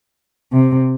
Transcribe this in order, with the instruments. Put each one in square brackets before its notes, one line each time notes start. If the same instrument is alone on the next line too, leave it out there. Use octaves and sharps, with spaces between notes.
[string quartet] C3